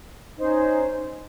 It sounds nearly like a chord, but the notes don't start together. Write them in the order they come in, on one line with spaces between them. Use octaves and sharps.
D#4 C5 C#4